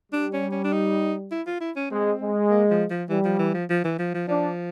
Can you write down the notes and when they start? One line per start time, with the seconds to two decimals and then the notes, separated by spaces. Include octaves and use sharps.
0.12 G3 D4
0.33 C#4
0.52 C#4
0.64 D4
0.73 D#4
1.32 E4
1.47 F4
1.61 E4
1.76 C#4
1.90 G#3 C4
2.21 G#3
2.50 A#3
2.71 F3
2.90 F3
3.09 E3 G3
3.25 F3
3.39 E3
3.54 F3
3.70 F3
3.84 E3
3.99 F3
4.14 F3
4.28 F3 D4